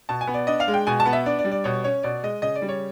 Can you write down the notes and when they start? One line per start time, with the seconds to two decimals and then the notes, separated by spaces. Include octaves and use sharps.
0.09 B2 A5
0.21 G#5
0.27 B3
0.34 D5
0.47 D4 D#5
0.60 F5
0.68 G#3
0.74 G5
0.87 B2 G#5
1.00 A5
1.06 B3
1.13 E5
1.26 D4 D5
1.39 D5
1.45 G3
1.52 D5
1.64 B2 C#5
1.84 C#4 C#5
2.03 B2 D5
2.23 G#3 D#5
2.42 C#3 D#5
2.56 D5
2.62 G3
2.69 C#5